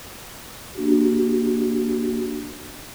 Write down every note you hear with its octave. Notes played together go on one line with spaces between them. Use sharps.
A#3 D4 F#4 G4